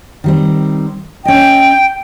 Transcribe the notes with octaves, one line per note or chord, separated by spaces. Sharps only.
D#3 G3 C4
C#4 D#5 G5